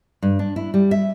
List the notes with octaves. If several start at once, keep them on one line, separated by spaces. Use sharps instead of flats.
G2
D4
E4
G3
E5